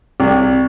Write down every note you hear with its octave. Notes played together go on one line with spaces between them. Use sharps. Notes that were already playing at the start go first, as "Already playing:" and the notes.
C2